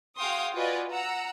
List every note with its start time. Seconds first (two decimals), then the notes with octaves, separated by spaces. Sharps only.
0.17 F#4 G#4 F5 G5 C6 D#6
0.55 F4 F#4 B4 D5 D#5 G#5
0.89 F#5 A#5 E6